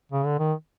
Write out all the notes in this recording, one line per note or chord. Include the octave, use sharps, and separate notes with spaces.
C#3
D3
D#3